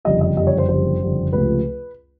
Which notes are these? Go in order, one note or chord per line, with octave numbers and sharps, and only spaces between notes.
F#1 F2 D3 G3 D#5
D#5
F#1 F2 D3 G3 D#5
C#5
C5
F#1 F2 D3 G3 C5
F#1 F2 D3 G3
C#2 C3 F3 A3 B4